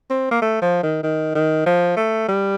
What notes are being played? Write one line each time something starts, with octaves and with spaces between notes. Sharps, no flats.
C4
A#3
A3
F3
D#3
D#3
D#3
F3
A3
G3